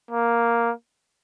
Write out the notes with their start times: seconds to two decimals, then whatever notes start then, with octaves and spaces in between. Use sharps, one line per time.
0.11 A#3